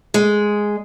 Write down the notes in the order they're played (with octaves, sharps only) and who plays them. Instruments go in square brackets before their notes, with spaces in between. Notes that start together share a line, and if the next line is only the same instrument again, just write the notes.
[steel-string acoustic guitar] G#3